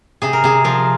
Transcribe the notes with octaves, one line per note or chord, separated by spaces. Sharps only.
C3 G#4
A#4
C3 G#4
F3 A#4